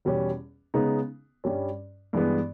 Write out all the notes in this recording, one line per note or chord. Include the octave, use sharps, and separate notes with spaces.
E2 B2 G3 C#4
C#3 G#3 B3 D#4
G2 G3 C#4
G2 E3 G#3 B3